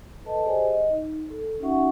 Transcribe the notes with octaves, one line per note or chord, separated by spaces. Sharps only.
A4 B4 D#5 A5
G4 G#4 C5 D5 D#5 G#5
D#5
D#4
A4
C#4 D#4 F#4 E5 F#5 C#6